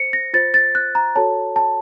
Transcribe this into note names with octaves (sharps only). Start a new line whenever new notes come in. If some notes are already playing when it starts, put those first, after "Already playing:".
Already playing: C5 C#7
A#6
F4 C5 A6
A6
F#6
A#5
F#4 A4 C#5 A5
A5